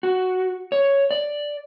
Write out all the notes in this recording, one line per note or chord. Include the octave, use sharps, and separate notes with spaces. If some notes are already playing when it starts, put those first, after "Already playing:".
F#4
C#5
D5